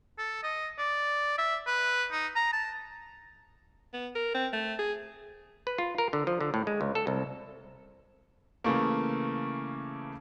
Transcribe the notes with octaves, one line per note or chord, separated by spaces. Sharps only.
A4
D#5
D5
E5
B4
D#4
A#5
A5
B3
A#4
C4
A3
G#4
B4
F4
A#4
D3
F3
D3
A2
G#3
C#2
A4
C2
C#3 E3 A3 A#3